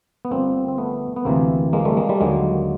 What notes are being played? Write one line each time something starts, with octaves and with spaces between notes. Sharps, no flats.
B3
G1 G2 D3 F3 A#3 C4
C4
A3 B3
B3
D2 C3 E3 A#3 C4
G#3 A#3
G3 A3
G#3 A#3
G3 A3
D#2 D3 F#3 G#3 A#3